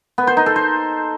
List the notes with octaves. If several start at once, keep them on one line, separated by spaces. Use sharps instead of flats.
B3
C5
D#4
A4
C5